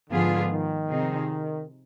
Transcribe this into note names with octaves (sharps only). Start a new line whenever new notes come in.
G#2 D3 F3 B3 F4 G#4
D#3
C3 F3 C4 D#4 G#4